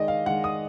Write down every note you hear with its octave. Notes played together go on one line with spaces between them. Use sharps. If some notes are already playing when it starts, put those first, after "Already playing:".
Already playing: D#3 G#3 D5 D#5
F5
D#3 G#3 F#5
D#6